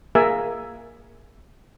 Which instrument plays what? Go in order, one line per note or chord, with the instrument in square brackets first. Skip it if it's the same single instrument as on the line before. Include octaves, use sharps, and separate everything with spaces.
[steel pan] A#3 G#4 A#4 E5 G#5